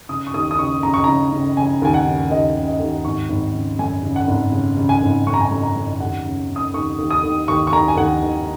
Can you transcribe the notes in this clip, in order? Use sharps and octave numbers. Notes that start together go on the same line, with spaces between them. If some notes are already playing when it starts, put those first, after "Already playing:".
C#3 D#6
C#6
D#2 D#6
D#6
C#3 C#6
C#3 A#5
C#6
C#3 A#5
C#3
C#3 G#5
D#2 G#5
F#5
C#3
D#2 D#5
C#3
D#5
D#2
G#1 C#6
G#1
C#3
F#2 G#5
C#3
F#5
G#1
C#3
C#3
G#5
G#1
F#2 C#6
A#5
G#5
F#2 A#5
A#5
F#2
D#2 F#5
C#3
C#3
D#6
D#2 C#6
D#2
D#6
D#2
D#2 C#6
C#6
D#2 A#5
G#5
D#2 F#5
D#2